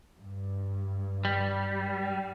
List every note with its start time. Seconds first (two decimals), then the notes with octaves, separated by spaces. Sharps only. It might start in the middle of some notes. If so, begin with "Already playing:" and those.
0.18 G2
1.25 G3